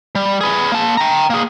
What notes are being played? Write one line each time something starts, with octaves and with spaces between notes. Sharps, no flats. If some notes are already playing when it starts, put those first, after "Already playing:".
G3
G#4 B4
A#3 A5
G5 A#5
A#3 G#4